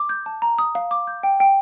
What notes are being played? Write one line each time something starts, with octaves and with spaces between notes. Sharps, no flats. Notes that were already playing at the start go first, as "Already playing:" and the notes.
Already playing: D6
G6
A5
A#5
D#6
F5
D6
G6
G5
G5